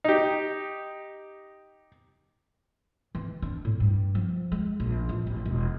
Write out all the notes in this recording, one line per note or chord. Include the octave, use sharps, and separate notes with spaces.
D#4 G4
E3
D4
A2
G2
F3
G#3
A#1
A1
A1
E1